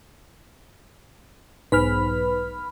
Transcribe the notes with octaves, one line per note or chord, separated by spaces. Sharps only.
B1 G#2 B4 B5 F6